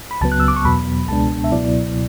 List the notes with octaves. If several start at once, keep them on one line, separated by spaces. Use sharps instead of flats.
B5
C#2 C#3 F#3 B3 A5
F#6
E6
D6
C#6
E2 B2 F#3 B3 B5
C#2 B2 G#3 B3 D4 A5
E5
C#2 B2 F#3 B3 E4 D5